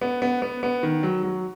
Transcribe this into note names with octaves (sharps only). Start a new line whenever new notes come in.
B3
B3
B3
B3
D#3
F#3
F#3